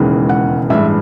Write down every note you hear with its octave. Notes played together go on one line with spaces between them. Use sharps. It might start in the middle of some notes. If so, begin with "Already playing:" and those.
Already playing: E1 D#2 C#3 E3 G#3
F#5
A1 G2 E3 G#3 E5